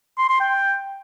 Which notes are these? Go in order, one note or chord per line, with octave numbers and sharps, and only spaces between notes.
C6
C6
G5